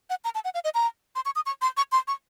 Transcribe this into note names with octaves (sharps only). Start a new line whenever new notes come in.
F#5
A#5
A5
F#5
F5
D#5
A#5
C6
C#6
D#6
C#6
C6
C#6
C6
C#6